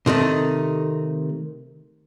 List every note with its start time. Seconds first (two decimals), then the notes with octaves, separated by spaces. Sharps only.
0.06 C3 D#3 A3 D#4